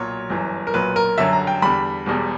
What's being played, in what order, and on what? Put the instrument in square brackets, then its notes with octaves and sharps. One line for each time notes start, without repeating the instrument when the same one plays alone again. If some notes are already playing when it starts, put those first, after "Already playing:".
Already playing: [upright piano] B1 A#2 F#3 C#5
G1 F#2 E3
A#4
B1 A#2 F#3 B4
A#4
G1 F#2 D3 F#3 E5
A#5
G5
E2 D3 G3 B5
E1 E2 B2 G3